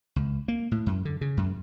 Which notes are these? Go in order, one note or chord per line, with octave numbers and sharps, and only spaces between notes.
C#2
A#3
A2
F#2
D3
C#3
F#2